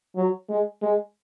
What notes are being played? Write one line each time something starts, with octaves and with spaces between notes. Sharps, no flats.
F#3
G#3
G#3